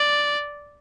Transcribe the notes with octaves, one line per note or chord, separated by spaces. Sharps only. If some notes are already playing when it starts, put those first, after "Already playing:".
Already playing: D5